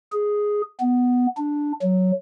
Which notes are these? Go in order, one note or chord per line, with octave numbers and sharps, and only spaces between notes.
G#4
B3
D4
F#3